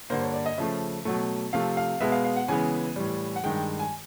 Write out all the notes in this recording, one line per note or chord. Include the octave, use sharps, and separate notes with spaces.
G2 D3 G3 A#3 C5
C#5
D5
D#5
C#3 F3 A3 E5
B2 F#3 A3
C3 F3 A3 F5
F5
B2 G#3 B3 E5
F5
F5
F#5
C#3 E3 G#3 B3 G#5
A2 E3 G3
F#5
G2 D#3 G#3 G5
G5
G#5